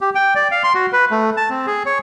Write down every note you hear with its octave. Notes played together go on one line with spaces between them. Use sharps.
G4
G5
D5
F5
C6
F#4
B4
A3
A5
C4
G#4
C#5